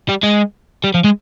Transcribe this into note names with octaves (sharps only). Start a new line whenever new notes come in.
G3
G#3
G3
F3
G#3